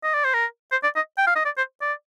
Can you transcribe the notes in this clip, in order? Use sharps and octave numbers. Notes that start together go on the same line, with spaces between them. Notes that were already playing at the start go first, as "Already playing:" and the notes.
D#5
D5
C5
A#4
C5
D5
D#5
G5
F5
D#5
D5
C5
D5